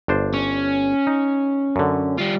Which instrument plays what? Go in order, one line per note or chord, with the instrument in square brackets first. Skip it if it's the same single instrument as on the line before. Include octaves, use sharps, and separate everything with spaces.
[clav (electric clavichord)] G1 D4 C5
[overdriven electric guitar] C#4
[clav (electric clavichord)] D#4
F#2 D3
[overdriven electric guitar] G3 F4